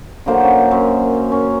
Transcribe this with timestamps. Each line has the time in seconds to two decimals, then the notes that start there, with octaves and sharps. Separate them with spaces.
0.26 D3 F#3 A#3 C5
0.40 C#4 C5
0.71 F#2
1.32 C#4